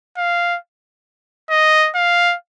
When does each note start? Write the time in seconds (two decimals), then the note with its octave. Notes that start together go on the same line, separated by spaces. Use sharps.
0.17 F5
1.50 D#5
1.95 F5